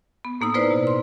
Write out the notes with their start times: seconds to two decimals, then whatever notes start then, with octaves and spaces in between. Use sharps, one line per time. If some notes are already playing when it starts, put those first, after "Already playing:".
0.25 B3
0.41 A2 A#3 D#4 E6
0.54 A#3 E4 B4 C5 D5 F6
0.71 B2
0.87 C6